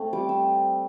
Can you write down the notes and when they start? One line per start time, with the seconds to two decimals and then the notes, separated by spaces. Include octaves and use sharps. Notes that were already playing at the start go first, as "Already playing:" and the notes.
Already playing: A3 C4
0.13 G3 D6
0.29 E6